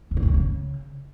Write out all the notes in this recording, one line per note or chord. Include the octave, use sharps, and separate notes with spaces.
C3
E2
B2
E2
C#3